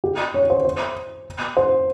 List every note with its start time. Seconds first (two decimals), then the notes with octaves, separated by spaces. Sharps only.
0.04 G4
0.34 C#5
0.50 C5
0.65 C5
1.57 C5